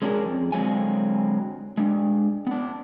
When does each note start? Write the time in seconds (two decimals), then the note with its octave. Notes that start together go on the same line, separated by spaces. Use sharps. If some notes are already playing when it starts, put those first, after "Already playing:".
0.02 G#3 C#4 D4 F4 G#4 A#4
0.25 F2
0.52 D3 F#3 G#3 C4 F5 G#5
1.78 G#3 D4
2.47 B3 D4